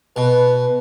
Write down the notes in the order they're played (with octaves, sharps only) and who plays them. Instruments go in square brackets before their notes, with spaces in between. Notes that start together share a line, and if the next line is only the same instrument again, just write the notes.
[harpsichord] B2 [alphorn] B4